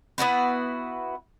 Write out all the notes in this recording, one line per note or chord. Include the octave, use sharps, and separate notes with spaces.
B3 E4 F#4 B4